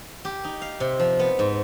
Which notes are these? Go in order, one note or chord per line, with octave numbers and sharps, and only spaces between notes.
G4
D#4
F5
C3
F3
B3
G#2